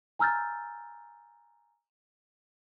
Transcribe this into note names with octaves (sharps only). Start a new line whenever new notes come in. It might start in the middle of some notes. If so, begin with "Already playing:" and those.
G#5 A#5 E6 F6 G6 A6